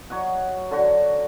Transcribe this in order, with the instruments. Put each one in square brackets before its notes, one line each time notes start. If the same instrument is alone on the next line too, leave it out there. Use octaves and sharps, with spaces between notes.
[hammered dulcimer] F#3 C#5 D#5 F#5
D3 F#4